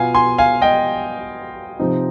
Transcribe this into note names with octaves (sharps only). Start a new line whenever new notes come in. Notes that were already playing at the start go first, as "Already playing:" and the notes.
Already playing: B2 B3 F4 F5 G#5
G#5 C6
F5 G#5
D#5 G5
C3 F3 C4 D#4